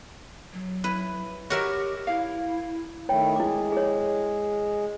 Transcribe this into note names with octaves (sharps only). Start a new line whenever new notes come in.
F#3
E4 B4
F#4 G4 A#4 C#5 E5
E4 F5
D#3 A3 E4 C#5 G5
G#3 E4 D6
G#4 C#5